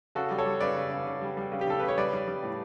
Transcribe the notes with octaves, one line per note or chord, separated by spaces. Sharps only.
C#3 F#4 A4
G3
A4 C#5
G3
C#3 B4 D5
C#3
C#3
C#3
G3
G3
C#3
G4
C#3 A4
C#3 B4
C#5
G3 B4 D5
G3
G3
A2